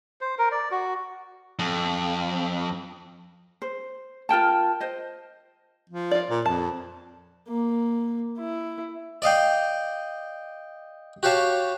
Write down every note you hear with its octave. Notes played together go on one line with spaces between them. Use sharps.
C5
A#4
D5
F#4
F2
C5
F4 A#4 G5 A5
C5 D#5
F3
F4 D5
A#2
F2 A5
A#3
E4
D5 D#5 F5 G5
F#4 G4 C#5 F5 A5